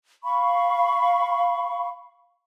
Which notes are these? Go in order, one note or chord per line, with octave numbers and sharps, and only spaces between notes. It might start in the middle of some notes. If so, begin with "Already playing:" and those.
F5 B5 C#6